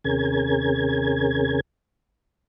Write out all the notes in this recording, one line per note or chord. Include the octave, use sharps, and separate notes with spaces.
D#2 C3 C#4 G#4 A#4 G#6